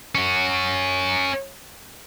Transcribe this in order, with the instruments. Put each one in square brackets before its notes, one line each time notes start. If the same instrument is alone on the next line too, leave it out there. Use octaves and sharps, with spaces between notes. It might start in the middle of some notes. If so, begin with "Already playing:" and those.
[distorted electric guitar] C#4 F#4